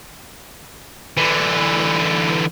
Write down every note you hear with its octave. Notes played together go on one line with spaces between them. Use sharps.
D3 E3